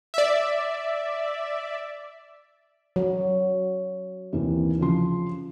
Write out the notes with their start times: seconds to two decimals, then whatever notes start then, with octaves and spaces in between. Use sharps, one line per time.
0.14 D5 E5
2.96 F#3
4.33 D#2 C3 E3
4.79 C#3 F3 C6